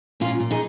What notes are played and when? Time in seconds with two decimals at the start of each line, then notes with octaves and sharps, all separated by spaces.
0.20 A#2 C#4 F4
0.40 A#2
0.51 D#4 G#4